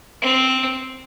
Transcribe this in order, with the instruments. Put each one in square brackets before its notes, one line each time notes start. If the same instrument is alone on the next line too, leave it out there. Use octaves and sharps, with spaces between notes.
[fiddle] C4